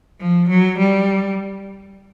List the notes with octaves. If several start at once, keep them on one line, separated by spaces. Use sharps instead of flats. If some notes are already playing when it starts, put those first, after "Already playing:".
F3
F#3
G3